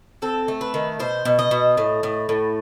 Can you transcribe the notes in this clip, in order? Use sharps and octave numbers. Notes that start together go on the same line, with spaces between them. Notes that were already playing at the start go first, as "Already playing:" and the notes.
C4 A4
A3
B4
D#3
B2 C5
B2
D#5
B2
A2
A2
A2